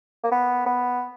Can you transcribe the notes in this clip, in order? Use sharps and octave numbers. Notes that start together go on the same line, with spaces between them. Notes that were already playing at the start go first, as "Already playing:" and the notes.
A#3
B3
B3